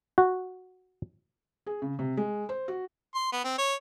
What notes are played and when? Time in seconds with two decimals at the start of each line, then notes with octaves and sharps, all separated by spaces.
0.18 F#4
1.66 G#4
1.82 C#3
1.99 C3
2.17 G#3
2.49 C5
2.68 F#4
3.15 C6
3.32 B3
3.44 C4
3.58 C#5